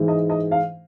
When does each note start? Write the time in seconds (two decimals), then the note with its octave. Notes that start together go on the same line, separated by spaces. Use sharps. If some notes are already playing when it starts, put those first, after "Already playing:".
Already playing: G#2 E3 G#3
0.08 D#5
0.30 D#5
0.51 F5